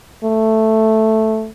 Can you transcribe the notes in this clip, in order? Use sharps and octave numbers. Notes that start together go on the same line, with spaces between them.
A3